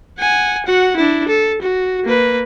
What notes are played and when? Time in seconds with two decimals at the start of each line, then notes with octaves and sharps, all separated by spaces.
0.19 F#5 G#5
0.66 F#4 F#5
0.97 D4 E4
1.28 A4
1.62 F#4
2.05 A#3 B4